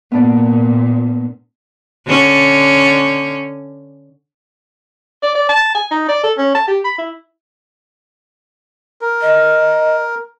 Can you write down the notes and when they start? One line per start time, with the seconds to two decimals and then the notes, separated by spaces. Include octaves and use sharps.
0.12 A#2 B3 D4 D5
2.07 D3 C#4
5.23 D5
5.35 D5
5.49 A5
5.75 G#5
5.91 D#4
6.09 D5
6.23 A4
6.37 C#4
6.55 A5
6.68 G4
6.84 B5
6.98 E4
9.01 A#4
9.22 D#5